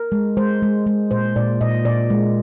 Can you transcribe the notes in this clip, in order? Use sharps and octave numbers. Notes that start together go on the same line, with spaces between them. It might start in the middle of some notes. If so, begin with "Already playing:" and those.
Already playing: A#4
G#3
G#3 C5
G#3
G#3
A#2 C5
A#2 D5
A#2 D#5
A#2 D5
G#3